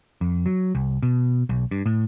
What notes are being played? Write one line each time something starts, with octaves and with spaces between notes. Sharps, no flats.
F2
F#3
C2
B2
B1
G2
A2